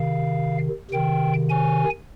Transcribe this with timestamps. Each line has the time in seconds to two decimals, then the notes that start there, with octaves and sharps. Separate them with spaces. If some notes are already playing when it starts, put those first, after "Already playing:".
Already playing: C3 D#3 F5
0.91 C3 D#3 G5
1.50 G#5